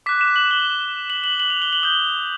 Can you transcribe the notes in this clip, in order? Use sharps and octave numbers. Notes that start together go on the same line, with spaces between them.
D6 F#6 B6
E7
F#7
G7
F#7
F#7
F#7
F7
G7
F#7
D#6 G6 G7